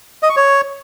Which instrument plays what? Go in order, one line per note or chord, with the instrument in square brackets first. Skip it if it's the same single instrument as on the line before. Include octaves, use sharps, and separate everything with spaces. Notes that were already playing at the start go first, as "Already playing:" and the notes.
[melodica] D#5
C#6
C#5